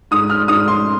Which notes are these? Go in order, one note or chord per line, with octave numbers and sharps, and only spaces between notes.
G#2 D#6
F6
G#2 D#6
C6